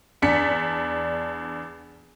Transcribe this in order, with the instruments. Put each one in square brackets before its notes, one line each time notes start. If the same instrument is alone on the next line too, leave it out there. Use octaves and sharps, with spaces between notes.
[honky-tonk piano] E2 D4 B6 C#7